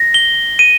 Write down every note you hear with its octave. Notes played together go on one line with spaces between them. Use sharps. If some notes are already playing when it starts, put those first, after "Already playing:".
Already playing: A#6
G7
D#7